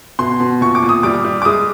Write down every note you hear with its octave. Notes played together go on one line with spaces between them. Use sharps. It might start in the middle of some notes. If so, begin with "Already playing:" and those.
B2 C6
B2
A#2 C#6
D6
A#2
D#6
G3 D6
G3
D6
G#3 D#6